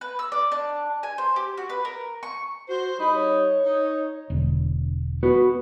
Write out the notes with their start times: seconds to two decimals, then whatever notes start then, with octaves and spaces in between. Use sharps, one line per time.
0.01 B4
0.19 E6
0.32 D5
0.52 D4
1.03 G#5
1.18 C5
1.36 G4
1.57 F#4
1.69 B4
1.85 A#4
2.23 C#6
2.68 F#4 C5
2.98 G3 D#4 B5
3.15 C#5
3.64 D#4
4.30 E1 D3
5.23 B3 F#4 B4